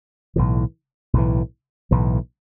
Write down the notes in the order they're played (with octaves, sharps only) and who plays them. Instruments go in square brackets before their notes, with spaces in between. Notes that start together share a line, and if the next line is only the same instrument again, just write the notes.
[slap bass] B1 A2 E3
B1 A2 E3
B1 A2 E3